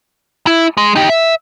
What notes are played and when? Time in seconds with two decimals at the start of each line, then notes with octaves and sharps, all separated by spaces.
0.47 E4
0.77 G#3
0.96 D#4 G4
1.09 E5